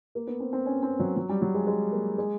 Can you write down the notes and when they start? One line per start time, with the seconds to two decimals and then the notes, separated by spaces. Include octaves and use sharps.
0.15 A#3
0.27 B3
0.40 C4
0.53 C4
0.66 C#4
0.83 C4
0.99 F#3
1.16 F#3
1.29 G3
1.42 F#3
1.54 G#3
1.67 G#3
1.92 A#3
2.18 G#3